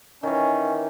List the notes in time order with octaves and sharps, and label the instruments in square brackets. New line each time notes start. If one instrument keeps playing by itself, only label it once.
[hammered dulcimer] D#3 E3 [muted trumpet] C#4